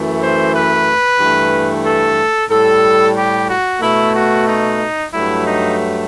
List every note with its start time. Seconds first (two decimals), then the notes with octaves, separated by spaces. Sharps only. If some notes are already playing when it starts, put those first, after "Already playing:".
Already playing: F#2 E3 A3
0.21 C5
0.54 B4
1.19 G2 E3 A3
1.85 A4
2.50 A2 G3 A4
3.15 G4
3.49 F#4
3.81 B2 A3 E4
4.15 F#4
4.48 D#4
5.13 G2 F#3 A3 E4
5.46 D#4